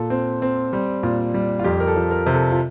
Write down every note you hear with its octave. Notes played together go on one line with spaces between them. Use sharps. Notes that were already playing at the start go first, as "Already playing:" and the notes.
Already playing: A#2 A4
C4
C4
G3
A#2
G3
F4
F2 G4
A#4
A4
F3
A#4
C3
A4
F4